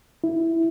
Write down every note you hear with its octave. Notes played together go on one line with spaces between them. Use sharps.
E4